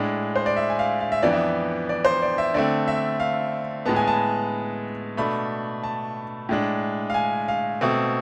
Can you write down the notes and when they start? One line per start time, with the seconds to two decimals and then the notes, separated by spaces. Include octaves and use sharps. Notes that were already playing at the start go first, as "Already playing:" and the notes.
Already playing: A2 G#3 D4
0.36 C5
0.46 D5
0.57 E5
0.69 G#5
0.79 F5
1.00 F5
1.12 E5
1.23 F2 E3 B3 D4 D5
1.33 E5
1.89 D5
2.05 C5
2.22 D5
2.38 E5
2.54 D3 A3 C4 D5
2.88 E5
3.20 F5
3.86 A2 G#3 B3 A5
3.96 G#5
4.07 A5
5.17 B2 A3 D4 B5
5.83 A5
6.49 A2 G#3 D4
7.10 F5
7.14 G#5
7.48 F5
7.81 B2 A3 C4